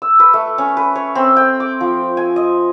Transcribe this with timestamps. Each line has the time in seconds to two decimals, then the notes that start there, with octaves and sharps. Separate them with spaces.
0.02 E6
0.20 B4
0.34 A3
0.58 C#4
0.77 B4
0.96 C#5
1.15 C4
1.37 G5
1.60 D6
1.81 F3
2.17 G#5
2.36 D#5